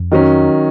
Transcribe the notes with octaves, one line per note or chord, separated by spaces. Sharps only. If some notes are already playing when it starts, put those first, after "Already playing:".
Already playing: F2
D#3 F#3 C#4